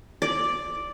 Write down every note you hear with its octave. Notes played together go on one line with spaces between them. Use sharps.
D5